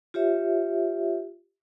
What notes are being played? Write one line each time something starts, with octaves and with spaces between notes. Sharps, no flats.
F4 G4 C#5 E5